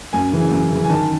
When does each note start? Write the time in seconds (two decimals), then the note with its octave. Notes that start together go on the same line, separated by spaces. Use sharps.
0.13 F#2 G#5
0.33 C#3 E3
0.51 F#2
0.71 C#3 E3
0.84 G#5
0.90 D#3 A5